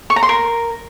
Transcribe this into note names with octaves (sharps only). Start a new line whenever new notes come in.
C#6
A#5
C6
A#4